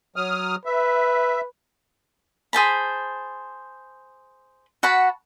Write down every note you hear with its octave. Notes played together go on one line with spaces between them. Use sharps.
F#3 D#6 F6
B4 E5
G#4 C5 A5 B5
F#4 F#5 A5 B5